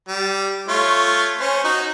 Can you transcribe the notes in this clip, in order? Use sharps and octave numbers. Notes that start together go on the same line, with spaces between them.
G3
A3 F4 C#5
C#4 C5
D#4 F#4